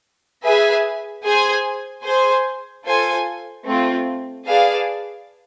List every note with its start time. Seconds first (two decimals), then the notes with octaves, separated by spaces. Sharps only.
0.44 G#4 B4 E5 G#5
1.24 G#4 C5 G#5
2.05 G#4 C5 G#5
2.85 F4 A4 C5 G#5
3.65 A3 C4 F4
4.46 G#4 B4 D5 F5 A5